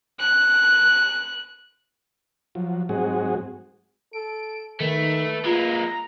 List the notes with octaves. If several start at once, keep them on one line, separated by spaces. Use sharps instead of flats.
F#6
F3 F#3
G#2 F#3 G#3 C4 F#4 G#4
A4 D7
D#3 A3 B4
G#3 A#3 F4 A#5